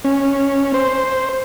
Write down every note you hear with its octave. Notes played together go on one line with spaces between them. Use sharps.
C#4
C5